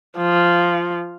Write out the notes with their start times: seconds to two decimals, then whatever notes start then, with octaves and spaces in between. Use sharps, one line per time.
0.17 F3